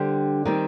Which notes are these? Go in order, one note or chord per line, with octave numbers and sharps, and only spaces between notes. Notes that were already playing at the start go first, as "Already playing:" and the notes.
Already playing: D3 G3 D4 G4 C5
D#3 G3 C4